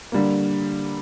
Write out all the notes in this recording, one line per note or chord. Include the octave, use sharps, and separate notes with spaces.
D3 G3 A#3